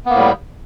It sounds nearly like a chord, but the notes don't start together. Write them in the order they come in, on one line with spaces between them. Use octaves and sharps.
B3 A#3 A2 G3